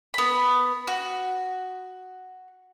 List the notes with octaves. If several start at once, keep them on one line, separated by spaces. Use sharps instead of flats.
B3 B5
F#4